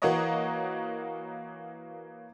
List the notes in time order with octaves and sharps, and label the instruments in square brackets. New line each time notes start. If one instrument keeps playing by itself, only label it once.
[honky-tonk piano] E3 A#3 F#4 A#4 C#5 D#5